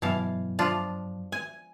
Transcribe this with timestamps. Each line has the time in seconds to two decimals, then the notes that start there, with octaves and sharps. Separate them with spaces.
0.02 G2 B2 E3 F#3 F5
0.59 F3 D4 F4
1.32 G#5